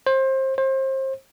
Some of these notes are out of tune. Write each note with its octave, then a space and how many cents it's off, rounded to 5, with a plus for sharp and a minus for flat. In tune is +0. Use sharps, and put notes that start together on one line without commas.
C5 +25
C5 +30